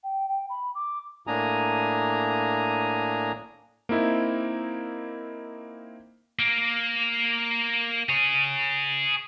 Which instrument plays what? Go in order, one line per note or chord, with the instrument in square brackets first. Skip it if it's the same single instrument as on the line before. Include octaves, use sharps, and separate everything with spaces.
[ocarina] G5
G5
B5
D6
[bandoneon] A2 A#3 D4 G#5 A#5 D#6
[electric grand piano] A#3 C4 D#4 E4
[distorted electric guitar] A#3
G#4 C#5